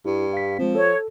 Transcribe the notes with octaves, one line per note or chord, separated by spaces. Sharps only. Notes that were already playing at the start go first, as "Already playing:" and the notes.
G2 E4
F5 B6
F3 G#3 C4
A4 C#5